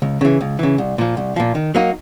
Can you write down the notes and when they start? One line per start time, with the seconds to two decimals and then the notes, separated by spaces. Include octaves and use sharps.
0.02 C#2
0.21 C#3 E3
0.41 C#2
0.59 C#3 E3
0.78 C2
0.98 A#2 F3
1.17 C2
1.36 A#2 F3
1.55 D#3
1.75 F#3 A#3 D#4